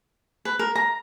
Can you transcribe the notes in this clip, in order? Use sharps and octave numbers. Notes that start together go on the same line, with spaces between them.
B4
A#4
A#5